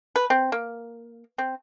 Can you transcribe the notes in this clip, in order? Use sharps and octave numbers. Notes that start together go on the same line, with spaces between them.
B4
C4
A#3
C4